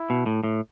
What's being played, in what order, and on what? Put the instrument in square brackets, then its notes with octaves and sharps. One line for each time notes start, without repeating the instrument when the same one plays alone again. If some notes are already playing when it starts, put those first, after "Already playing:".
Already playing: [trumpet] E4
[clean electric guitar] B2
A2
A2